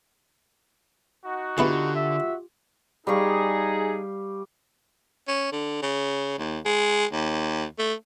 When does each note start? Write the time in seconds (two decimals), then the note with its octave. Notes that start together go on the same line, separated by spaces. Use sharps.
1.25 D#4 F#4
1.58 D3 B3 E4 F4 G4 G#4
1.95 F#4 E5
3.07 G3 D#4 G#4 F5 C#6
5.28 C#4
5.52 D3
5.82 C#3
6.38 D#2
6.65 G#3
7.12 D#2
7.79 A3